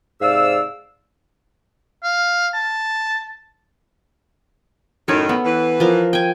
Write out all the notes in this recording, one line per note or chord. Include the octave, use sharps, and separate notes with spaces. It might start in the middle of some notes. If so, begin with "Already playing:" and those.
G#2 C3 D5 F5 E6
F5
A5
F#2 A2 D#3 A4 C#5
B3
E3 B4
F3 A#4
G5 G#5